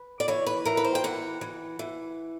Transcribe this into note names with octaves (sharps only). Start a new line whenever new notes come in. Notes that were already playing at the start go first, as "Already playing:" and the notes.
Already playing: B4
D5
E3 C#5
B4
E3 A#4
B4
C5
G5
E3 F#5
E3
E3